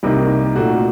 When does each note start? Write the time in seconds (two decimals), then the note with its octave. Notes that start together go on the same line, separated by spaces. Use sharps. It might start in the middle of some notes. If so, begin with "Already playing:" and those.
0.03 C2 C3 D#3 A#3 D#4
0.55 A#2 A3 D#4 F#4